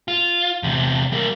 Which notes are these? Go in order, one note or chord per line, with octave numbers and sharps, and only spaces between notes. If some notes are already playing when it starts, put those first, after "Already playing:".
F4
E2 C3
G3 A#3